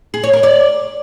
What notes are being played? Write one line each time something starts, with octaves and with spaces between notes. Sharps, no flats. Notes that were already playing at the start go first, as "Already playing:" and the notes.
G#4
C#5
A#4
D5